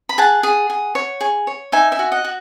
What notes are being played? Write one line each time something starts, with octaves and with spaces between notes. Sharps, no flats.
B5
G#4 F#5 A5
G#4
G#4
C#5
G#4
C#5
D#4 E5 G#5
E5 G#5
F#4
D#5 F#5
F#4